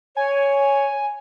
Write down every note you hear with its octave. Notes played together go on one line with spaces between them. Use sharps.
C#5 G#5